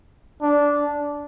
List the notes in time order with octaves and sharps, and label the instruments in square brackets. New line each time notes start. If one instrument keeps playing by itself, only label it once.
[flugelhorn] D4